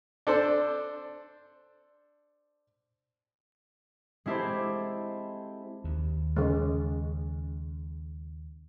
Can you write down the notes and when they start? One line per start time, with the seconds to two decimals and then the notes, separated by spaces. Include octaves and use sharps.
0.27 D4 A4 C5
4.26 G#3 C4 E4 G4 A4 C5
5.84 D#2
6.36 C#3 G#3